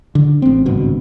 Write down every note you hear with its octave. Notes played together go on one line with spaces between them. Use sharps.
D3
A1 C4
G#1 C#2 G2 B2